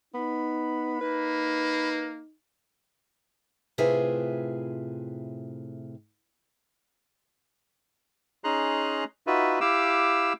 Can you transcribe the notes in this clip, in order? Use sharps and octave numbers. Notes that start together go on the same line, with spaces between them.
B3 D#4 B5
A#3 D#4 B4
A2 C3 F4 G#4 B4 E5
C#4 D#4 G#4 A#5 C6 F#6
D#4 F4 F#4 B4 E5
E4 G4 F5 D6 E6